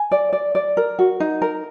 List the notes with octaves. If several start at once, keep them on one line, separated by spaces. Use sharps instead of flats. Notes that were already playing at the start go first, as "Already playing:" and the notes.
Already playing: G#5
D5
D5
D5
A#4
F#4
D#4
A#4